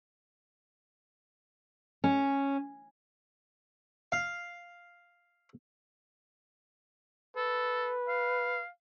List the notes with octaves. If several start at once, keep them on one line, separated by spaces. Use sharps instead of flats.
C#4
F5
A4 B4
F5